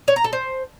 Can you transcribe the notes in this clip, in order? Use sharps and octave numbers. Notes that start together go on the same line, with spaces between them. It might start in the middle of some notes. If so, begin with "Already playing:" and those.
C#5
A#5
A4
C5